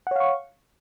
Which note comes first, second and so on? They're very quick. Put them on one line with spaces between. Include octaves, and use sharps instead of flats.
F#5 C#5 F5 C#6